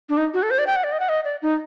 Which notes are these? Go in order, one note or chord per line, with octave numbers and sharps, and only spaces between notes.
D4
D#4
F#4
A4
C5
D5
G5
F#5
D5
D#5
F#5
D#5
D5
D#4